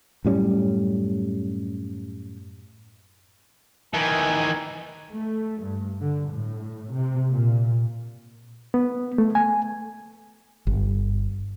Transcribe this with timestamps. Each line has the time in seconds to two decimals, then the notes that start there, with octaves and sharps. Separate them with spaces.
0.25 F#2 A2 G3 C#4
3.94 D#3 E3 G#5
5.12 A3
5.61 G2
6.01 D3
6.32 A2
6.93 C3
7.30 A#2
8.74 B3
9.18 A3
9.35 G#5
10.67 G1